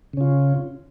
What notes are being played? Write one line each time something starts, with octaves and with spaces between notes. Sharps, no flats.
C#3 C#4 F4